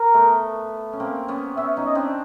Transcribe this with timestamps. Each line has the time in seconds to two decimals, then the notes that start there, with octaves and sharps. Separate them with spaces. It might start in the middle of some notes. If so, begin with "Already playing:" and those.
Already playing: A#4
0.14 A3 B3
0.93 C#4
1.00 A#3 C4
1.28 B3 C#4
1.57 B3 C#4 E5
1.77 C#4 D#4
1.86 D#5
1.95 C4 D4